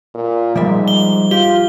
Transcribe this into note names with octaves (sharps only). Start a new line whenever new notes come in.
A#2
G#2 F3 G3 E5
G7
F4 G4 G7